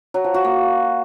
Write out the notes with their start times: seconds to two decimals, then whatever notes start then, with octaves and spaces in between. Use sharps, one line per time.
0.14 F#3
0.24 F3
0.34 F#4
0.45 A#3